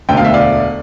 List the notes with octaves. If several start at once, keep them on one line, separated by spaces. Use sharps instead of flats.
E1 D2 D3 A3 G5
F5
E5
D5 F5